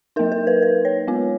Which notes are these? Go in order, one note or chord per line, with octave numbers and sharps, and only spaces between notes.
F#3 A#3 D#4 A#4
A#4
B4
B4
C#5
G#3 B3 F4